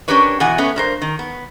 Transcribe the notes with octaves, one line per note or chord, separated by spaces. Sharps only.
C#4 D4 G4 A#4 B4 C#5
E2 B2 F#5 G#5
A3 B3 C#4
G2 A#4 C5
D#3
B3